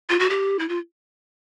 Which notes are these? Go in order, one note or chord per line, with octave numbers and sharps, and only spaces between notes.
F4
F#4
G4
E4
F4